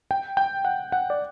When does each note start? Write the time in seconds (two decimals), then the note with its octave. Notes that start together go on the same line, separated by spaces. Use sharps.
0.11 G5
0.37 G5
0.65 F#5
0.92 F#5
1.10 D5